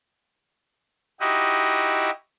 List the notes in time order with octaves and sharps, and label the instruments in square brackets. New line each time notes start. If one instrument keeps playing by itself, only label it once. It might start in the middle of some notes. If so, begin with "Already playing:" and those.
[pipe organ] D#4 E4 F#4 G4 D#5